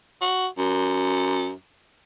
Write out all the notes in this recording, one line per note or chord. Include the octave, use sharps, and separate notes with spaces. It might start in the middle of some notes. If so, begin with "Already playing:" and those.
F#4
F#2